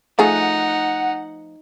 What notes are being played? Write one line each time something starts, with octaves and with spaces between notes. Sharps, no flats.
F3 A3 D#4 G#4 F#5